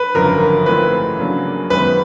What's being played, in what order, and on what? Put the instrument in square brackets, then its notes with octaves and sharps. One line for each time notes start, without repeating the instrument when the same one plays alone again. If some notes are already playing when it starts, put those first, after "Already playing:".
Already playing: [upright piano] B4
[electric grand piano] G#1 F#2 D3 F3 [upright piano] A#4
[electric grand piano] G#2 E3 A3 C4 F4 [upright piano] B4
[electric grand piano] C#3 F#3 A#3 D4
[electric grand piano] F#2 D#3 G#3 B3 [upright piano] B4